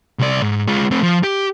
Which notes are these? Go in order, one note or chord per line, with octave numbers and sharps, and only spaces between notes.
C2 D5
G#2
G#3 F4
A3 C4
F3
G4